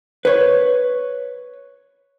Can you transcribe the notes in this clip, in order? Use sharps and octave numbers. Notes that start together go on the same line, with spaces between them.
B4 C#5